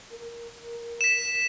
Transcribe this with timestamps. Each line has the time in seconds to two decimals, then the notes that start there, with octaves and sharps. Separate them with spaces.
0.12 A#4
1.01 B6 E7